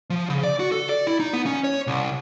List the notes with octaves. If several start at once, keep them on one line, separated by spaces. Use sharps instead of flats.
F3
C#3
D5
F#4
A4
D5
E4
D#4
B3
C#4
C#5
C2